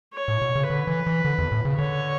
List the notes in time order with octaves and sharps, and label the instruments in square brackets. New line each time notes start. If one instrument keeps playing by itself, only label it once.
[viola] C#5
[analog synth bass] A2
B2
C#3
[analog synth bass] D3 [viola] B4
[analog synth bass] E3
E3
D3
E2
A2
C#3
[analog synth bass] D3 [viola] C#5